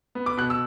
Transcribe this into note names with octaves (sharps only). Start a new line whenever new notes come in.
B3
D6
B2 F#6
E6